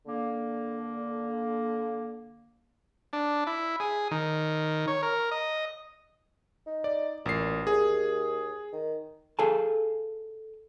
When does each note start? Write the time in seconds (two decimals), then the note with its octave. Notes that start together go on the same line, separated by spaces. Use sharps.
0.07 D3 A#3
3.13 D4
3.47 E4
3.80 G#4
4.11 D#3
4.88 C#5
5.02 A#4
5.31 D#5
6.67 D#4
6.84 D5
7.26 A1 A#2 C7
7.67 D#2 G#4
8.73 D#3
9.39 G#4 A4 F5 G#5 A5